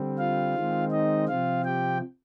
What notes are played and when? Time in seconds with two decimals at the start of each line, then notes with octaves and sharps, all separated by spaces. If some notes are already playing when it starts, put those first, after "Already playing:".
Already playing: D3 G3 C4
0.19 F4 F5
0.55 D#3 G#3 C4
0.91 D#4 D#5
1.28 C3 F3 C4 F4 F5
1.64 G4 G5